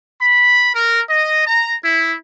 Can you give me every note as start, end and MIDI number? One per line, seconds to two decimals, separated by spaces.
0.22 0.70 83
0.74 1.01 70
1.10 1.46 75
1.47 1.75 82
1.84 2.15 64